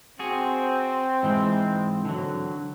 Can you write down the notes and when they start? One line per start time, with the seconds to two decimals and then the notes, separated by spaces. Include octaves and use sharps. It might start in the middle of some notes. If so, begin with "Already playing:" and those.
0.19 C4 F#4 G#4
1.23 G#2 E3 G#3
2.05 D3 F#3